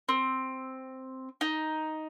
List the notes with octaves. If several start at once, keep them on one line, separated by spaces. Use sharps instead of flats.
C4
D#4